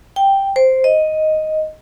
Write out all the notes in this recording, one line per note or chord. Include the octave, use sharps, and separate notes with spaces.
G5
C5
D#5